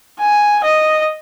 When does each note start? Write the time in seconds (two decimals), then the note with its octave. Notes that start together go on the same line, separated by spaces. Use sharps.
0.20 G#5
0.64 D#5